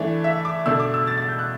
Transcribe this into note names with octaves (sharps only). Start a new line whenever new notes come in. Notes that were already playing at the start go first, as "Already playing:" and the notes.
Already playing: E3 A3 D4 D5
E5
D6
B2 A3 D4 E6
D6
E6
A6
A6
G6
F#6